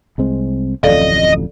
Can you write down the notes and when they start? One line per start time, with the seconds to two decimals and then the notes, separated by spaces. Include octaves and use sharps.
0.18 C2 G#3 C4
0.84 D1 A1 F2 A4 D5 D#5 F5